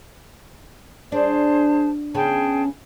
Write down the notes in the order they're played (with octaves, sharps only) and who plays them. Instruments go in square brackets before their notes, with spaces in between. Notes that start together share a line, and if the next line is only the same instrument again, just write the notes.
[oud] D4 [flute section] G#4 C5 A5
[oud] C#3 B3 C#4 [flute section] G#4 G5 A5